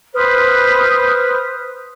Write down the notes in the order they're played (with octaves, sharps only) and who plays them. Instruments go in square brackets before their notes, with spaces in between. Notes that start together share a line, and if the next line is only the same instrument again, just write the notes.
[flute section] B4 C5 D#6 F6